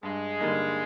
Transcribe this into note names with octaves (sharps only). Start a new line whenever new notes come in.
G2 G#3
D3 G3 A#3 D#4